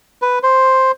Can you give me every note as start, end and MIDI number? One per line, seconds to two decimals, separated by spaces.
0.22 0.39 71
0.43 0.91 72